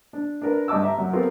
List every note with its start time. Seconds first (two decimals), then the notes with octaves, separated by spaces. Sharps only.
0.13 D4
0.42 D4 A#4 B4
0.68 G2 D#5 A5 D6 E6
0.83 G4 E5 A#5
0.98 F#2
1.13 B3 C4 F4 G4 A4 A#4